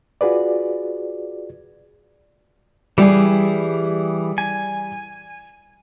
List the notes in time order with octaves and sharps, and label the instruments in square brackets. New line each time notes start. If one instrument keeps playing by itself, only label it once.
[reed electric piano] F4 F#4 G#4 B4 D5
[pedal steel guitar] E3 G4 G#4 [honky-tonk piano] G3
[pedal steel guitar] G#5